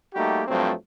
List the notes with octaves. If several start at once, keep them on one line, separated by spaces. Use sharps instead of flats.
G3 A3 A#3 D#4 F#4 G4
G2 F3 F#3 A3 C4